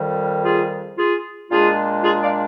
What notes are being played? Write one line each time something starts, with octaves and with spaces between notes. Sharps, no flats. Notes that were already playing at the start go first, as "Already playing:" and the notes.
Already playing: F2 D#3 G3
F4 G#4
F4 G#4
A#2 G#3 D4 F4 G#4
F4 G#4
D5 F5